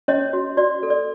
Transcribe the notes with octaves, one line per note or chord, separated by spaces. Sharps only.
C#4 C#5 D#5
F#4
F#4 D5
A4
D5